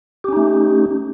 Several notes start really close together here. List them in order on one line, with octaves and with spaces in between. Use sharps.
G4 C#4 D#4 A3